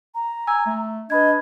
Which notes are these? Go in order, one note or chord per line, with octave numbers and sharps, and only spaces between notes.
A#5
G#5 E6
A3
D4 B4 D#5 B5 G#6